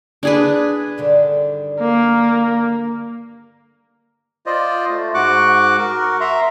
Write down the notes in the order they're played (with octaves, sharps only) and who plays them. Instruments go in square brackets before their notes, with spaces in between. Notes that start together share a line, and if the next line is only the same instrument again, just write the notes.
[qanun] D4 G#4 B4
[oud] G2 D3 D#3
[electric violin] A#3
[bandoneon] F4 C5 D5 D#5
A3
G#2 F#4 C#6 D6 F#6
F#4 A#4
E5 A#5 C6